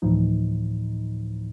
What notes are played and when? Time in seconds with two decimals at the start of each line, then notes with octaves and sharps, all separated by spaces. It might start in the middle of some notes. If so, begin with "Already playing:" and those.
0.02 D2 A2 E3 F3 D#4